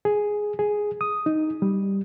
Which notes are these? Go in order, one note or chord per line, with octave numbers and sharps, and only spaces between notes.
G#4
G#4
D#6
D#4
G3